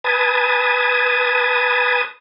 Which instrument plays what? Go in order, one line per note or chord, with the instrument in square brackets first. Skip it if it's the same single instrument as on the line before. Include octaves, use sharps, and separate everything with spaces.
[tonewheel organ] B4 G#5 A5 D#6